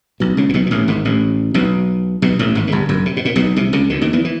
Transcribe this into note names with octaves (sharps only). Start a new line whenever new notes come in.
B1 B2
C#2 C#3
A#2
B1 B2
A#2
A1 A2
G#1 G#2
A1 A2
B1 B2
B1 B2
A1 A2
G#1 G#2
G#2
G1 G2
F#1 F#2
C3
B2
A#2
B1 B2
C2 C3
C#2 C#3
D2 D3
D#2 D#3
E2 E3
E3